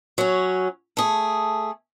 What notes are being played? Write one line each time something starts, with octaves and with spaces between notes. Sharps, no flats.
F#3 C#4
A3 G#4